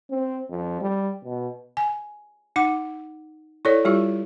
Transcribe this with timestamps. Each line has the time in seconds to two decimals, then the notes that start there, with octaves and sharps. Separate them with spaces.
0.10 C4
0.50 F2
0.81 G3
1.25 B2
1.77 G#5
2.56 D#4 F#5 D6
3.65 E4 A4 C#5 D5
3.85 G3 E4 F4 G4